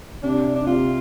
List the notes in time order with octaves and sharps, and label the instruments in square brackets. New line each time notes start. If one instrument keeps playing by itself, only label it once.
[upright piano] C3 [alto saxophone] D4
[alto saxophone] D4
[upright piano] C3 [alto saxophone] F4